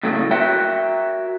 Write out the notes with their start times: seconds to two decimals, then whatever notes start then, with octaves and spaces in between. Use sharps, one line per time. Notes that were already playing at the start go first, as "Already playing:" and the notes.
0.03 A2 C#3 F#3 A3 A#3
0.31 F#4 A#4 E5 G5